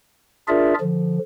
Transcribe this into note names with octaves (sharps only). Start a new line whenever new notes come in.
D4 F4 G#4 A#4 D5 E5
D3 F3